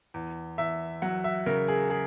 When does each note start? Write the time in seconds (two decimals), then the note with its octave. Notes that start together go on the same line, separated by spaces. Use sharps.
0.14 E2
0.58 E2 E5
1.02 F#3 F#5
1.24 E5
1.46 C#3 A#4
1.68 G#4
1.90 G#4